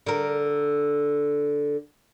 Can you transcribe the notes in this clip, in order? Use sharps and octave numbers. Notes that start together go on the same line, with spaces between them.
D3 A#4